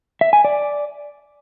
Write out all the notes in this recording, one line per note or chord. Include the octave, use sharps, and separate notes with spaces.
E5
G#5
D5